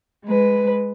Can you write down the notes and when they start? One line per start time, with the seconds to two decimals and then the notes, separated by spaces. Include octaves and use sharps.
0.25 G#3 B4